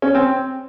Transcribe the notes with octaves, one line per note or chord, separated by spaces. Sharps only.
C#4
C4